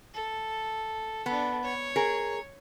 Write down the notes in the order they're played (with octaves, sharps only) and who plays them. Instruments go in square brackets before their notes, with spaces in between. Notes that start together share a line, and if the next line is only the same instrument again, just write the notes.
[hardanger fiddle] A4
[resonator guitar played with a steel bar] B3 [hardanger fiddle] D4 A4
[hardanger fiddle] C#5
[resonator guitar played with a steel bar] G#4 A#4